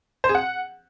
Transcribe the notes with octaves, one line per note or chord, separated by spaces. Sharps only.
C5
G#4
F#5